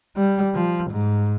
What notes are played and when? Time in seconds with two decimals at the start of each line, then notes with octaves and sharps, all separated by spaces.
0.16 G3
0.54 F3
0.91 G#2